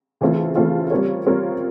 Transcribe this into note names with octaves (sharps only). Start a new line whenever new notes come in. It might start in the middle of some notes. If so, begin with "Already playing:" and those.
C#3 E3 A3 C4 F4
C#3 E3 A3 C4 F4
G3 C4 F4 A#4 C#5
G3 C4 F4 A#4 C#5